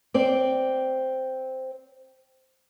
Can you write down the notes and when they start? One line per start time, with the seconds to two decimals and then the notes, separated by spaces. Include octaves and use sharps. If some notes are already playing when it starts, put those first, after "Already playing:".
0.14 C4 C5 D5